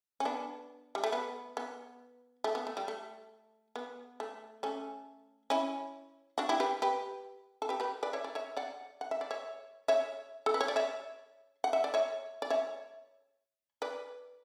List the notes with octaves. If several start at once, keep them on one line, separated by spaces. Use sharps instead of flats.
C#4
B3 D4
G3
A3
B3
B3
A3
B3
A3
G3
A3
B3
A3
A3 C#4
C#4 E4
D4 F#4
E4 G4
G4 B4
G4 B4
A4
G4 B4
G4 B4
B4 D5
C#5 E5
D5
C#5 E5
D5 F#5
F#5
E5
D5
C#5 E5
C#5 E5
A4
B4
C#5
D5
C#5 E5
F#5
E5
D5
C#5 E5
D5
C#5 E5
B4 D5